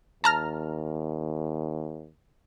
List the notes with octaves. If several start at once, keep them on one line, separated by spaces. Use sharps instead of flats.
D#2 A5 A#5 F6